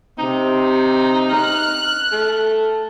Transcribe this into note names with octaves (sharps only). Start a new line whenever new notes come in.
C3 D#4
F6 F#6
A3